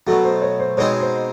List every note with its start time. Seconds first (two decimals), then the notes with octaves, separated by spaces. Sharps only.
0.07 B2 F#3 A3 F#4
0.25 C5
0.42 C#5
0.59 C5
0.77 B2 G#3 C4 D#4 G#4 C#5
1.01 C5